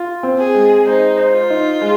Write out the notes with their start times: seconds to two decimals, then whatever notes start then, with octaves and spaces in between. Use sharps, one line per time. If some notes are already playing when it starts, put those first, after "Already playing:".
Already playing: F4
0.23 C4
0.39 G#4
0.55 G#3
0.87 D#4 C5
1.18 C5
1.34 F4
1.50 D#4
1.81 G#3